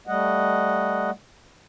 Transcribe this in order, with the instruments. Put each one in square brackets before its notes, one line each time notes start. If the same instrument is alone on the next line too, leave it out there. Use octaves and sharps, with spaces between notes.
[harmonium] G3 A3 D#5 F#5